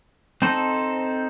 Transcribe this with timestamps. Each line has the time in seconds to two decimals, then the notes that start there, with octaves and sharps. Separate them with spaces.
0.42 C4 D#4 A4 C5